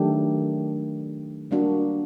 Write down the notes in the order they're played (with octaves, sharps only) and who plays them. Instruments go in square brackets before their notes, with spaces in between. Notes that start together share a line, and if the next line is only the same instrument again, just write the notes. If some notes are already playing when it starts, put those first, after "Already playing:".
Already playing: [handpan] D#3 F#3 A3 D4 G4
G3 A#3 D4 F#4